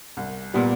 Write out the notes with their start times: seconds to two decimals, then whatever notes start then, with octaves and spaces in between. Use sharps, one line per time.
0.17 C2
0.54 A#2 G3 B3